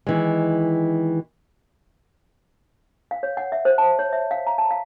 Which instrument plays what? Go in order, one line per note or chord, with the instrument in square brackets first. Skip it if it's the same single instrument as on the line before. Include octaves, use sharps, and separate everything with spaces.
[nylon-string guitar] D#3 E3 G#3
[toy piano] F5
C#5
F#5
E5
C5
A5
C#5
E5
F5
A#5
A5
F5